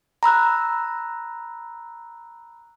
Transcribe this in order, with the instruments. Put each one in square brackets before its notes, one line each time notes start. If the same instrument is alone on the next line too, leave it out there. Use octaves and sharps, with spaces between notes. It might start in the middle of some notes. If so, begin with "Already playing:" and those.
[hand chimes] A#5 B5 E6 F#6